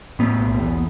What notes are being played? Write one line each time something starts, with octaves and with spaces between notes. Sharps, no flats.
A2 B3
B1
E2